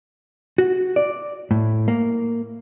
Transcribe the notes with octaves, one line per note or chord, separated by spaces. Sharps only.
F#4
D5
A2
A#3